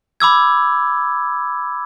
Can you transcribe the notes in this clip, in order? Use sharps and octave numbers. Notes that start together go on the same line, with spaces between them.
B5 D6 E6 G#6